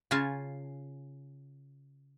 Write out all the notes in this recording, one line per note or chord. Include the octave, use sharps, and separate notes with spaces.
C#3 F4 G#5 A5